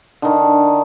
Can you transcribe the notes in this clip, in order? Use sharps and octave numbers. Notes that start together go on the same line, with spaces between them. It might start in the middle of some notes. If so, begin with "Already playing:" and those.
D3 D#3